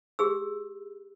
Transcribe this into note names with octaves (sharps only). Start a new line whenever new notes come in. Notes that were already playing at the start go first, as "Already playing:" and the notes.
G4 G#4 E6